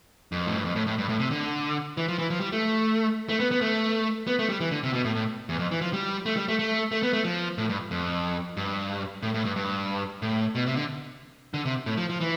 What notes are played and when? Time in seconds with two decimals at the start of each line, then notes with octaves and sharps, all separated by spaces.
0.32 F2
0.46 A2
0.56 G2
0.65 F2
0.76 A2
0.87 A2
0.98 G2
1.09 A2
1.20 C3
1.31 D3
1.97 E3
2.08 F3
2.19 E3
2.30 F3
2.40 G3
2.52 A3
3.29 A3
3.40 B3
3.51 B3
3.61 A3
4.27 B3
4.39 A3
4.49 G3
4.60 E3
4.71 D3
4.83 C3
4.93 B2
5.04 A2
5.15 A2
5.49 E2
5.59 F2
5.71 E3
5.81 F3
5.93 G3
6.26 A3
6.37 G3
6.48 A3
6.59 A3
6.92 A3
7.03 B3
7.13 A3
7.24 F3
7.58 A2
7.69 G2
7.91 F2
8.57 G2
9.22 A2
9.34 A2
9.45 G2
9.56 G2
10.22 A2
10.55 B2
10.66 C3
10.76 D3
11.54 D3
11.65 C3
11.86 A2
11.97 F3
12.09 F3
12.21 E3